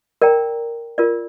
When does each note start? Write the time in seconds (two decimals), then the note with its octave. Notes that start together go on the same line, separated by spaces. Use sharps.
0.22 A#4 D5 G5 A#5
0.98 F4 A#4 D5